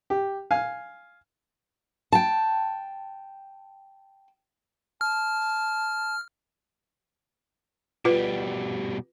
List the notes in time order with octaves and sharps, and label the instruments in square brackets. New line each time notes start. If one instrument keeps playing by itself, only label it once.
[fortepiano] G4
F5 G#5
[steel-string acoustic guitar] G5 A5
[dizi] A5 [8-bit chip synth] F6
[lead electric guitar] B2 G3 [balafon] F4 B4